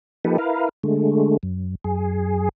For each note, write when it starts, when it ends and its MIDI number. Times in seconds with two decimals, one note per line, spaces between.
0.25 0.37 53
0.25 0.37 58
0.25 0.37 63
0.25 0.37 67
0.25 0.37 69
0.25 0.37 71
0.38 0.69 64
0.38 0.69 70
0.38 0.69 71
0.38 0.69 77
0.84 1.37 50
0.84 1.37 56
0.84 1.37 57
1.43 1.75 42
1.84 2.49 42
1.84 2.49 68